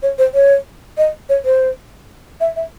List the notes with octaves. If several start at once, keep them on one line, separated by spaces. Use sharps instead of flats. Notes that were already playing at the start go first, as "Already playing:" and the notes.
C#5
C5
C#5
D#5
C#5
C5
E5
E5